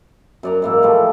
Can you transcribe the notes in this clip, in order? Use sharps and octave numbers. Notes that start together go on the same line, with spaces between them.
F#2 D5 A#5
G#2 E3 A#3
A2 F3 G3 A3